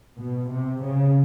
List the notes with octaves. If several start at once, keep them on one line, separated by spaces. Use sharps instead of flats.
B2
C3
C#3